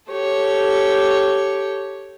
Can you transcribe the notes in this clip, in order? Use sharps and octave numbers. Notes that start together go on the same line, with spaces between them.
G4 A4 C#5